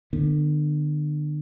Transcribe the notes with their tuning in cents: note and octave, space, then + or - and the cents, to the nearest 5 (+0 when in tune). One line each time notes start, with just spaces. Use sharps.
D3 +35 B3 +0